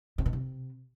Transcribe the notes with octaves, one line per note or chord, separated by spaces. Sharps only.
C3
B2
C3